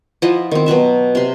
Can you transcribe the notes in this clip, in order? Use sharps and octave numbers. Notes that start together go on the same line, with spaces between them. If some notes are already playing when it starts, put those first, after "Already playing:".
F3 E4 D#5 F#5
D#3 C4
B2 F#3 F#4 E5
C3 C6